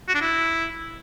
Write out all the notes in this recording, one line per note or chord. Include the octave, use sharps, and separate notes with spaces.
F#4
D4
E4